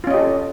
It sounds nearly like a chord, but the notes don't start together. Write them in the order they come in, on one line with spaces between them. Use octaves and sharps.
F4 C#4 D#5 G4 A4